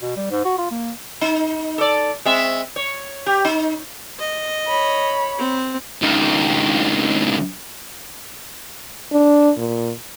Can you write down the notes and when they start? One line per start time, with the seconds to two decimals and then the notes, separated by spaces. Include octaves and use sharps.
0.02 B2
0.16 G3
0.31 G#2
0.45 F#4
0.58 F4
0.71 A#3
1.21 D#4
1.78 A4 D5
2.26 G#3 C4 E5
2.76 C#5
3.26 G4
3.45 D#4
4.19 D#5
4.67 C#5 B5
5.38 C4
6.02 C#2 D#3
9.12 D4
9.57 A#2